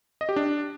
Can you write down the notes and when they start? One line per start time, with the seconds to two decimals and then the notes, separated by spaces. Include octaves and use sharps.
0.21 D#5
0.29 G4
0.36 D4